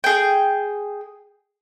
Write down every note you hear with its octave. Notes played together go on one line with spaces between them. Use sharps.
G#4 G5